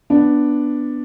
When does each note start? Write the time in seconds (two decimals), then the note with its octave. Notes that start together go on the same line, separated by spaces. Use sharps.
0.10 B3 D4